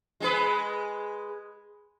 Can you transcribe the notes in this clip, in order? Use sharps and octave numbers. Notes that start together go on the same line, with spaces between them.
G#3 G#4 B4